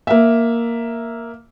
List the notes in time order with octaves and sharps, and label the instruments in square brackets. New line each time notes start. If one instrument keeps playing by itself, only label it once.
[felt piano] A#3 E5